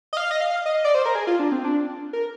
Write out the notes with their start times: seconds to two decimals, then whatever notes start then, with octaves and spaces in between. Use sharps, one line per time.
0.13 D#5
0.17 F5
0.31 D#5
0.41 F5
0.66 D#5
0.85 D5
0.95 C5
1.05 A#4
1.15 G#4
1.27 F4
1.39 D4
1.52 C4
1.64 D4
2.13 A#4